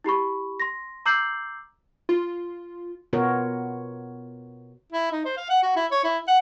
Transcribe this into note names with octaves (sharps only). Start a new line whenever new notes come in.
E4 G4 B5 C#6
C6 A#6
A#5 D6 E6 G6 C7 F#7
F4
B2 B3 F4 F#4 A#4 C#5
E4
D#4
C5
F5
F#5
F#4
E4
C#5
E4
F#5